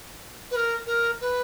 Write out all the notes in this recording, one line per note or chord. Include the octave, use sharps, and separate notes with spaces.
B4
A#4
A#4
B4